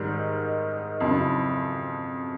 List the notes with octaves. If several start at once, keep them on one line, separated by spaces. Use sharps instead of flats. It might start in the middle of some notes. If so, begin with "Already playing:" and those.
Already playing: G#2 D#3 G3
D#4
D#4
D#4
F2 C#3 F#3 E4